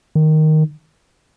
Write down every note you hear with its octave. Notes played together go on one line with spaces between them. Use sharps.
D#3